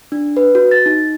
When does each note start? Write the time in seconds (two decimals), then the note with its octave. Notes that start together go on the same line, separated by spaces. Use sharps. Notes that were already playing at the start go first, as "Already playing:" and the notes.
0.12 D4
0.37 B4
0.55 F#4
0.71 A6
0.86 D#4